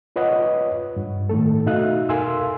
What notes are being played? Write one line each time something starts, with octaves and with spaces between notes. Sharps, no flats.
F4 B4 C#5 D#5 F#5
G2
A2 D#3 A3 A4
B2 D#4 F#4 E5 F5 F#6
A4 A#4 F5 G#5 C6 E6